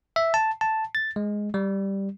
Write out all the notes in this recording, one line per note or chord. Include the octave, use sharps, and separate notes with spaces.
E5
A5
A5
A6
G#3
G3